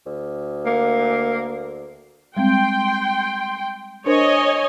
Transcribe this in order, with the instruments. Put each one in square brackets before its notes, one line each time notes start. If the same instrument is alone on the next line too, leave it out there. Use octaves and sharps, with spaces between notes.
[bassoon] D2
[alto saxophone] A#3
[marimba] G3 G#3 C4 [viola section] G5 C6
[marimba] D4 A#4 C5 [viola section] C#5 D#5 G#5